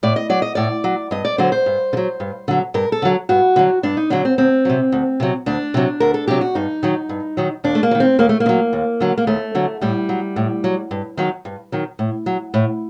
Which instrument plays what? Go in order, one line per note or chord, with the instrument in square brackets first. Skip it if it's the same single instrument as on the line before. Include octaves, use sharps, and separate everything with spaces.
[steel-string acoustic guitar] A2 D5
D#5
F#3 D5
D#5
A2 D5
F#3
G2 D#5
D5
D3 F#3 C5
C5
G2
D3
F#3
G2
D3 F#3
G2 A#4
A4
D3 F#3
G2 F#4
D3 F#3
G2 D4
D#4
D3 F#3 D4
C4
D2 C4
C3 F#3
D2
C3 F#3
D2 D4
C3 F#3
D2 A#4
A4
C3 F#3 G4
F#4
G2 D#4
D#3 F#3
G2
D#3 F#3
D#2 D4
A3
A#3
F#3
D#3
C4
D#2 A#3
A3
A#3
D#3
F#3
D#2
D3 F#3
A#3
D#2 A3
D3 F#3
A2 G3
F#3
A2
F#3
G2
D#3 F#3
G2
D#3 F#3
A2
F#3
A2